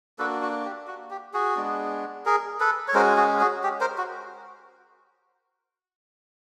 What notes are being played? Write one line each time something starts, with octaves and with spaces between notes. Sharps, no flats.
A#3 D4 F#4 A4 B4
F#4
G4
F#4
G4
F#4 G#4
G#3 B3 D4
G#4 A#4
A4 B4
C#5
G#3 C#4 F#4 A#4 C5
F#4 G#4
F#4 G#4
G4
A#4 C5
F#4